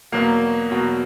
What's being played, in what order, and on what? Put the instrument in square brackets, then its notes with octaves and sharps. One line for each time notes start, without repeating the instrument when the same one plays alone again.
[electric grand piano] E2 B2 F#3 B3 F#4 [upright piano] A#3
[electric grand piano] E2 B2 F#3 B3 F#4